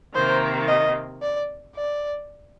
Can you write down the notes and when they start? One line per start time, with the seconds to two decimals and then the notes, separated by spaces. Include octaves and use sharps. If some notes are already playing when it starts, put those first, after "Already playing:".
0.15 C3 D#3 A#3 C5
0.68 D#5
1.22 D5
1.75 D5